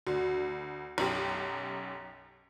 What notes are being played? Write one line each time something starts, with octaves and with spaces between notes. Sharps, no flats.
D2 F#4
B1 F#2 G4